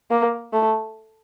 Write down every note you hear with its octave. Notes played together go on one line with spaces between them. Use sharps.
A#3
A3